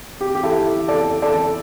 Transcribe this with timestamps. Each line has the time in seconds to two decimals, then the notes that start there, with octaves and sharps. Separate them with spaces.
0.21 G4
0.35 G4
0.43 E4 A4
0.88 A4 D5
1.22 A4 D5